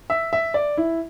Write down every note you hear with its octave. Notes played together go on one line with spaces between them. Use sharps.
E5
E5
D5
E4